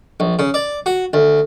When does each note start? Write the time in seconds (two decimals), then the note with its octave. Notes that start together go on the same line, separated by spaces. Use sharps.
0.20 A#1
0.39 C#3
0.54 D5
0.86 F#4
1.13 D2